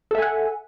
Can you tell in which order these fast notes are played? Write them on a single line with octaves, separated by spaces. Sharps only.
A4 E5 G#5 F#5